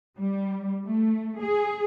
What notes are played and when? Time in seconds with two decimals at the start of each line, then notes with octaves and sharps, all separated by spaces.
0.19 G3
0.86 A3
1.41 G#4